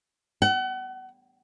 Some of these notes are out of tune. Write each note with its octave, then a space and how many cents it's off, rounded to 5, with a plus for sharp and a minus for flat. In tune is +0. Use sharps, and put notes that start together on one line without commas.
F#5 +35